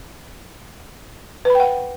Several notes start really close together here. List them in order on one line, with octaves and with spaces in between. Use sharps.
B4 B5 G5 F#5